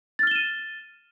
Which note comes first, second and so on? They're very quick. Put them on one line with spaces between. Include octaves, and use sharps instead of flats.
A6 F6 G7 E7 D#7